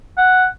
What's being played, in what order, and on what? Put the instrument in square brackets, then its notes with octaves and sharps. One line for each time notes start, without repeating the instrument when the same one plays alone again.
[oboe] F#5